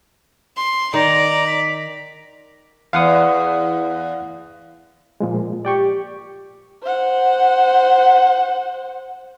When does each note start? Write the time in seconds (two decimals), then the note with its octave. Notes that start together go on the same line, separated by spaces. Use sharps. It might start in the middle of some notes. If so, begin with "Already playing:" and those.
0.57 C6
0.94 D#3 D5 A#5
1.47 B6
2.93 E2 F5 F#5 D#6
5.20 A#2 F3 G#3
5.65 G4 D5 G5 C#6
6.83 C5 F#5